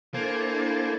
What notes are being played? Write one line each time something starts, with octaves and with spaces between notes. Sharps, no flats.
A#3 D4 E4 A4 C5 G#5